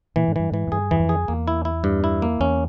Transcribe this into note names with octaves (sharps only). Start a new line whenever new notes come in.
A#2 E3
G#2
G2 E3
G#2 E3
G#2
G2 G#4
E2 E3
F2
G#4
E2 A#3
E4
E4
G2
E4
A#3
E2 C#4